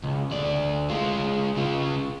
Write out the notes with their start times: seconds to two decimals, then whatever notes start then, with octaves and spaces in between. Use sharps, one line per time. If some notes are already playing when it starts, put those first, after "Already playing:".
0.03 C#2
0.31 D2 D5
0.90 G#3 F4
1.57 C#3 F4